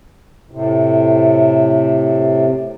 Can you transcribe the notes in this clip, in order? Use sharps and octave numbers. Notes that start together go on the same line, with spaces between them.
A2 C3